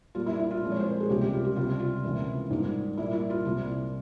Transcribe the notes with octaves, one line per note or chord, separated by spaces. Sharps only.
A#2 G3 A#3 F4
E4
E4
F4
A#2 F3 G#3 C4
C#5
C5
A#4
G#4
C#2 C3 G3 A#3 G4
G4
F4
G4
C#2 C3 G3 C4 F4
F4
C#2 C3 E3 A#3
G#2 G3 A#3
A#2 G3 A#3 E4
E4
F4
C2 C3 G3 A#3 F4